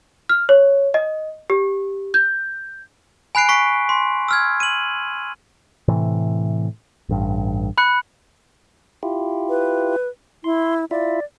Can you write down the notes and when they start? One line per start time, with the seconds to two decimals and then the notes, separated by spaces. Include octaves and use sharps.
0.29 F6
0.49 C#5
0.94 D#5
1.50 G4
2.14 G6
3.35 G#5 B5 F#6 C7 D7
3.49 C#6 B6 C7 D7
3.89 C6
4.28 E6 F6 G#6
4.60 D#7 F#7
5.88 A2 C3 E3
7.09 A1 G2
7.78 B5 F#6 C#7
9.03 E4 F4 G4
9.49 B4
10.44 E4 C6
10.91 E4 F4 D5 E5